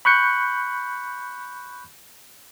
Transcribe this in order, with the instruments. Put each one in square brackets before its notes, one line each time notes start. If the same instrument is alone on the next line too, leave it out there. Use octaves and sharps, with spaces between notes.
[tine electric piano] B5 C#6 F#6 G6 C#7